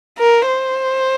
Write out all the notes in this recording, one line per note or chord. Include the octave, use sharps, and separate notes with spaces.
A#4
C5